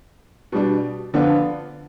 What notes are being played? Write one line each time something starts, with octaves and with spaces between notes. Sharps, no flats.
B2 G3 D4
D3 F3 B3 D4 F4